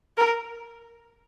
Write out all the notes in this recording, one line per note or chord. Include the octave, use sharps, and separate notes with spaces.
A#4